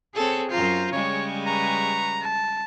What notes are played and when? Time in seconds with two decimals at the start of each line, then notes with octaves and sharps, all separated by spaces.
0.15 C4 G#4 A4 C#5
0.50 F#2 F4 C5 A#5 C7
0.93 C#3 G3 G#3 C#5 C#6
1.47 B4 A#5 C#6
2.23 A5